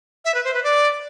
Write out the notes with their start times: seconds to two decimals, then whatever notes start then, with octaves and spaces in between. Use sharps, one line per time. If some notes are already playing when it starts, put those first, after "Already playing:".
0.25 E5
0.35 B4
0.44 C5
0.54 B4
0.64 D5